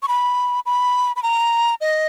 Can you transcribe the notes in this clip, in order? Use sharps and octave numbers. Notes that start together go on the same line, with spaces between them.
C#6
B5
B5
B5
A#5
D#5